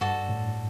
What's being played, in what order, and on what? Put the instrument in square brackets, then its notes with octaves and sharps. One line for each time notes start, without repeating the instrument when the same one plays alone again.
[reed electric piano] G2 [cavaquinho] F#4 A4 D5 A5
[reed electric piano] A2